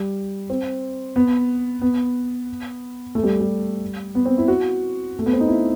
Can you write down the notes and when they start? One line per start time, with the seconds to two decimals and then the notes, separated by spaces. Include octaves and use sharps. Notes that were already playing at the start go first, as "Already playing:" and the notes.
Already playing: G3
0.50 C4
1.16 B3
1.82 B3
3.15 A3
3.23 G3
3.40 G3
4.15 B3
4.26 C4
4.38 E4
4.48 F#4
5.19 A3
5.26 B3
5.33 C4
5.40 D#4
5.48 E4